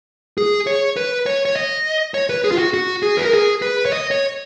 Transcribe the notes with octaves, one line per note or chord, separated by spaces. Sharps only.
G#4
C#5
B4
C#5
C#5
D#5
C#5
B4
G#4
F4
F#4
F#4
G#4
B4
A#4
G#4
B4
C#5
D#5
C#5